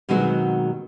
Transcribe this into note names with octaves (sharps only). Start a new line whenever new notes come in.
B2 D#3 F#3 G#3 C4 F#4